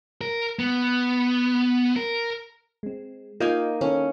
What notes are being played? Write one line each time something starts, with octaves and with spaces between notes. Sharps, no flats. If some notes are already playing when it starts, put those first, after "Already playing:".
A#4
B3
A#4
G#3 C4
A#3 D#4 F4 D#5 G#5 G6
D#3 C#4 E4 A4